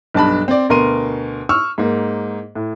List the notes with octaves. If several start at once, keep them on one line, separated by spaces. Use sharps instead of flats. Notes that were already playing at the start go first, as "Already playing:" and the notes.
B1 G2 A5 B5
C4 D5
D2 B2 A#4 C6 D#7
C#6 E6 F6
G#2 A#3
A2